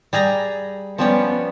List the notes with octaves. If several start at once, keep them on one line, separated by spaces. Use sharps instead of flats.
G3 G#4 A#5
F3 G3 B3 C#4